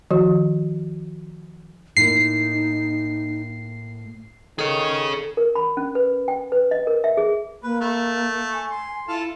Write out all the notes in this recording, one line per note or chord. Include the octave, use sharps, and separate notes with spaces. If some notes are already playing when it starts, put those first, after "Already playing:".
D#3 F3 F#4
A2 A#3 D#4 C7
D#3 G#4 A4 C#5
A#4
B5
C#4
B4
G5
B4
D#5
A#4
E5
G#4
A#3 B4
A3
G#5
C6
E4 F4 A4 F5